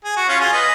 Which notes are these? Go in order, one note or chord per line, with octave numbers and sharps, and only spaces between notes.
G#4
F#4
C#4 F4
F4 G#4
B4 D#5